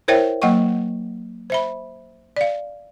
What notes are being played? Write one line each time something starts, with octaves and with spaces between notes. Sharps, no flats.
E4 A#4 C5 C#5 E5 G5
F#3 A#3 D#5 F#5 G5 C#6
C5 E5 B5
D5 F5